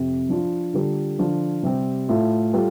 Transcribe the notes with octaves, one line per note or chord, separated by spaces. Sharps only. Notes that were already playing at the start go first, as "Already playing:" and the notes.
Already playing: F2 C3 C4
F3 D4 F4
D3 G3 F4 A4
D3 F3 D4 F4
C3 G3 C4 G4
A2 A3 F4
G3 F4 A4